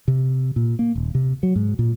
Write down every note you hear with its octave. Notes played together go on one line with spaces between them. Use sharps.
C3
A#2
A#3
D#1
C3
F#3
G#2
A#2